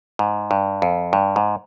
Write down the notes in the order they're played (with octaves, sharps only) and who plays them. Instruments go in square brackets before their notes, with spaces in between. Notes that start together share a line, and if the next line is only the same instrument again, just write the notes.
[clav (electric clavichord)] G#2
G2
F2
G2
G#2